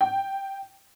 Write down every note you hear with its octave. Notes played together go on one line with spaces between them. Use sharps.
G5